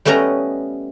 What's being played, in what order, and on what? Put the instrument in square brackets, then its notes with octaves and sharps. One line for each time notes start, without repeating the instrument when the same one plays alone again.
[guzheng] G3 A3 B3 C#4 D#5 A#5